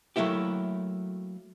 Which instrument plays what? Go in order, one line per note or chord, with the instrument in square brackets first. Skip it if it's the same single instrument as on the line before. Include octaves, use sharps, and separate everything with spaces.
[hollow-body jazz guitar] F#3 A3 A#3 E4 G4